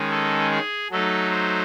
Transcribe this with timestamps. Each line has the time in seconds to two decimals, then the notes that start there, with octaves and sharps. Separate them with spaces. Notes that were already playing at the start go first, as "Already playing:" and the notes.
Already playing: D#3 G#3 C#4
0.11 A4
0.52 G#4
0.91 F#3 A3 D#4 A4
1.31 C5